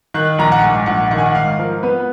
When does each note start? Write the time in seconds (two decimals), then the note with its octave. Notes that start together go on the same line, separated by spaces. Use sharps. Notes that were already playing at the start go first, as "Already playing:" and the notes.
0.14 D#3 F#6
0.38 A#1 A#5
0.52 F#5
0.63 G#2 G#5
0.86 A#1 F#5
1.11 D#3 F#5
1.18 G#5
1.26 F#5
1.34 G#2 F5
1.59 F3 A#4
1.83 B3 B4